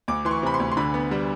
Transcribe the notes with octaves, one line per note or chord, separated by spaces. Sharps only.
D2 D6
E3 C6
C#6
C3 B5
C6
D2
C6
D3 B5
B3
G3